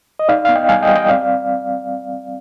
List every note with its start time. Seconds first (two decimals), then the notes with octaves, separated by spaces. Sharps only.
0.19 D#5
0.28 D#4 D5 F5
0.45 B3 F5
0.56 D#5 G5
0.69 G3 F5 G#5
0.82 D#5 G5
0.89 G3
0.95 D#5 G5
1.09 C4 D5 F5